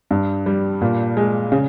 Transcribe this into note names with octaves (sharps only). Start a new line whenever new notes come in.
G2
G3
A#2
G#3
C#3